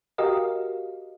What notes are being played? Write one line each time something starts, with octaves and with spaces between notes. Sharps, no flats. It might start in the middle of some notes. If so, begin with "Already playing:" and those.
F#4 G4 A#4 D#5 F5